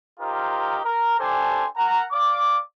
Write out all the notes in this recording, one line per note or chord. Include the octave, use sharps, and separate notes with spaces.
D#4 F4 G4 A#4 C5
A#4
D4 G4 A4 C5 G#5
A#4 F#5 A#5
D5 F5 D6